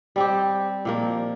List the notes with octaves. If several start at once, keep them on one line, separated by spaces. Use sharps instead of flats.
G3 C4 G4
A#2 F3 A#3